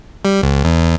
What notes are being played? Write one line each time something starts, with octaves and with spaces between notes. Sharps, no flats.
G3
C#2
E2